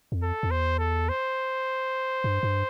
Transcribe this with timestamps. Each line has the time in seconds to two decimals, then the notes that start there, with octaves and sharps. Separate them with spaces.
0.12 F2
0.22 A4
0.43 F2
0.50 E2 C5
0.79 A4
1.09 C5
2.24 G2
2.43 G2